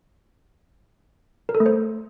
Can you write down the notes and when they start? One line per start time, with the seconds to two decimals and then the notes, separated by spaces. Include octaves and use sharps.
1.49 A#4
1.55 A4
1.60 A3
1.66 C5